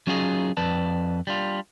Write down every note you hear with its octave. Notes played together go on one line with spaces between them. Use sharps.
F#3 C#4 D#4 F4 G#4 D#5
F2 B4 D5 A5
G3 D4 F4